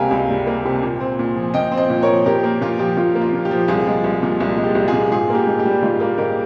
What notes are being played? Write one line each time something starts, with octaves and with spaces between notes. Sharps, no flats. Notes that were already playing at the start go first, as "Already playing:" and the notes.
Already playing: C#2 C3 G3 A#3 F5 G5 G#5 A#5
C#2
G3
A#3
C3
A#2
C4
A#2
F3
A#2 D#5 G5
C4
C5 D#5
A#2
A#4 C#5
F3
A#2 G4 A#4
A#3
A#2 F4
F3 G4
A#2 F4
A#3
F4
A#2
G4
F3
C2 F4 G#4
G#3
C2
A#2
C2
G#3
G4
C2
F4 G#4
A#2
G#2 F4 G#4
A#3 G4
G#2
G4
G3
G#2 F4
A#3 F4
G#2 G4 A#4